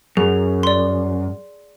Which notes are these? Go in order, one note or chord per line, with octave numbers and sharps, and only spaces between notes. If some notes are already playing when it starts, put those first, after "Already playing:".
F#2 G#4
D5 C6